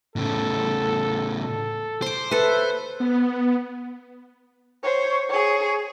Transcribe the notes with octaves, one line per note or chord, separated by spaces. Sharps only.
A2 C#3 A4
A4
C5 C6 D6
A4 B4 E5
B3
C5 C#5
G#4 C#5